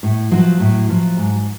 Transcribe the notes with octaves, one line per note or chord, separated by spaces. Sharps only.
A2
F3 F#3
A2
F3
G#2